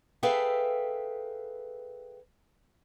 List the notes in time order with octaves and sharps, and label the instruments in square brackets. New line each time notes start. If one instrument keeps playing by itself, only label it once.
[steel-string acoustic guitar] G#4 A4 B4 E5 F5 G5